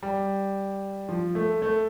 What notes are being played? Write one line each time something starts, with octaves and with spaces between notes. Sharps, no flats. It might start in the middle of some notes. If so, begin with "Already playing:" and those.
G3
F3
A3
A3